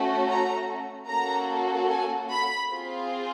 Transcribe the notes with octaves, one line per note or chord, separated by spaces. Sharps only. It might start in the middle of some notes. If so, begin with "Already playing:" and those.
Already playing: A3 C#4 F#4 A4
A#5
A#3 C#4 F#4 A4 A#5
G#5
B5
C4 F4 G#4